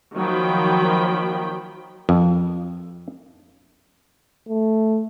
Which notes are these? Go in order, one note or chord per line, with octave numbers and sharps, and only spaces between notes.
D#3 F3 F#3 A#3 G5 B5
F2
A3